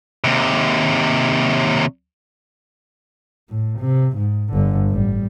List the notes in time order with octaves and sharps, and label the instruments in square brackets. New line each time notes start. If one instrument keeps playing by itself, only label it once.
[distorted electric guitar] D#2 C3
[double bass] A2
C3
G#2
G1 D3
A1 G3